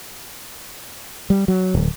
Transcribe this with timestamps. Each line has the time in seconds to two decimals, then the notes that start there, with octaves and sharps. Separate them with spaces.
1.30 G3
1.48 F#3
1.75 D1